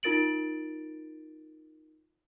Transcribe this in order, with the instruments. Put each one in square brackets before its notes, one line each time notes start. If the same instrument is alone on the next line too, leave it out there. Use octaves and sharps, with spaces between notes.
[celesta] D#4 F4 A#4 A6 D7 F#7